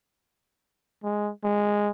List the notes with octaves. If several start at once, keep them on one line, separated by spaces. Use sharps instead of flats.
G#3
G#3